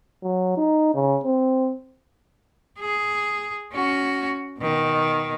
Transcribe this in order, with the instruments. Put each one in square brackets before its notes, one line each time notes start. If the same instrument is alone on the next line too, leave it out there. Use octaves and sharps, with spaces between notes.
[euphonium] F#3
D#4
C#3
C4
[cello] G#4
C#4 F#4
B2 D#3